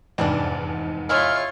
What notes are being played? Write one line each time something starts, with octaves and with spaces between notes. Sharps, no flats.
F1 E2 G#2 E3 G3 D4
C#3 G#3 E4 F4 C#5 F6